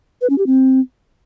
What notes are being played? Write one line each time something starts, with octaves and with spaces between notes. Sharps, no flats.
B4
C#4
G4
C4